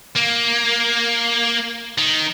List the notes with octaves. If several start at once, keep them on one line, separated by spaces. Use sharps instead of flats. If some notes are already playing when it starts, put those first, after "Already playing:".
A#3
D#3